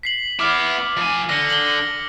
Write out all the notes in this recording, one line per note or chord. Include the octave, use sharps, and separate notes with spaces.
B6 C7 F#7
B3 E4 D6 F6
F3 G#5
D3 A#6 C#7
F#7 G7